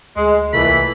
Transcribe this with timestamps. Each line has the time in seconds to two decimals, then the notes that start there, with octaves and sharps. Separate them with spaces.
0.16 D2 G#3
0.53 C2 A#2 E3 A3 B5